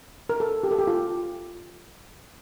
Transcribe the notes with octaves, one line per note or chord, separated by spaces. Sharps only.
A#4
A4
G4
A4
G4
F4